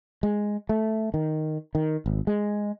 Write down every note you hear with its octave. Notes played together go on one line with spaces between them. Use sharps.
G#3
A3
D#3
D#3
G#1
G#3